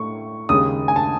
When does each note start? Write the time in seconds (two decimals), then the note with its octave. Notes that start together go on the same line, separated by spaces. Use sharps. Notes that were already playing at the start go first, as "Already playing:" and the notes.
Already playing: A2 A3 C#6
0.49 D#2 C#3 G#3 D#6
0.88 G#5
0.96 A5